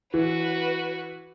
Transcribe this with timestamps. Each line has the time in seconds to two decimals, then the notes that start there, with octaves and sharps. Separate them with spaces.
0.14 E3 F#4 B4